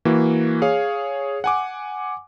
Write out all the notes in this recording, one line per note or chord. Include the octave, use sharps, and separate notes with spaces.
E3 A#3 F#4
G#4 C#5 F5
F#5 G#5 D6